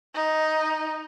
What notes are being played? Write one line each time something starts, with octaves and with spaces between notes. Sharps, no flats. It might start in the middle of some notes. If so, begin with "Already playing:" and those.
D#4